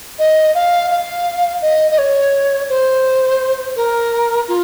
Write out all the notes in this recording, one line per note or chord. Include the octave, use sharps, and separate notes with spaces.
D#5
F5
F5
D#5
D#5
C#5
C5
A#4
F4